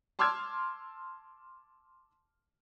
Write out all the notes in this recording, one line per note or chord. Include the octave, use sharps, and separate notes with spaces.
A5 C6 D6 E6 F6 G#6